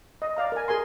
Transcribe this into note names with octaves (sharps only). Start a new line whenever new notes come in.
D#5
D5 F5 A#5
A#4 G#5
G#4 A#4 G#5 C6